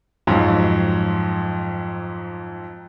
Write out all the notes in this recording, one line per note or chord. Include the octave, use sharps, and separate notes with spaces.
F2 G#2 F#3